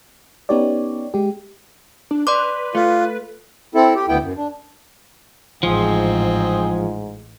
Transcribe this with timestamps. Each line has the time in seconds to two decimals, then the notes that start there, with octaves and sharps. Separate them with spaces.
0.49 B3 C#4 D#4 G4 C#5 D5
1.14 G#3 G4
2.11 D4
2.27 B4 D5 C6 D6
2.75 A3 F4
3.75 C4 E4 A4
3.95 G4
4.08 D2 B3 E4 G5
4.22 F#2
4.37 D4
5.63 A1 G#2 F3 C4 G#4